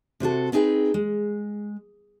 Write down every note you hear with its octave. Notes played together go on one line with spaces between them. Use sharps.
C3 C4 F#4 A4
B3 C4 D#4 G#4 B4 G5
G#3